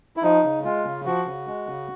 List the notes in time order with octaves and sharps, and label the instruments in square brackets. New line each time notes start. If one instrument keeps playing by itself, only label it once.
[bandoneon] E4
F3 D#4
C#3
G#3 F4
C#3
F3 F#4
C#3
G#3
C#3